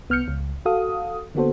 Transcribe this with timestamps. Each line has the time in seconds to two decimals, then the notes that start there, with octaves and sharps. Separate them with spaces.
0.09 C2 B3 F6 G6 C#7
0.28 C#2
0.65 F#4 A4 F5 D#6
1.35 D3 A#3 B3 F#4 A4 C5